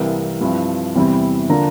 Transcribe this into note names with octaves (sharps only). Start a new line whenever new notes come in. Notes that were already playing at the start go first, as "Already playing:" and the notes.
Already playing: C2 C3 E3 A#3
G2 F3 C4 E4
E2 C3 G3 C4 E4
D3 F3 A#3 D4 A#5